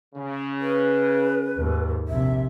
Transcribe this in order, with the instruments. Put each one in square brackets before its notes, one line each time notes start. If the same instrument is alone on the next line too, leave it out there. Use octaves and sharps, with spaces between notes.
[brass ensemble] C#3
[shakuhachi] B4
[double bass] D#2 G#2
[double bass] A#1 C3 [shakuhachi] E5